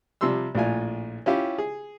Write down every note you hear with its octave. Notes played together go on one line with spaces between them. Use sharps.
C3 F3 G3 C6 E6
A#1 A2 F4 G#5
C#4 E4 F4 G4
G#4